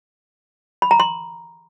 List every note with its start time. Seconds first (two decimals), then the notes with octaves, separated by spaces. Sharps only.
0.82 B5
0.91 A#5
1.00 C6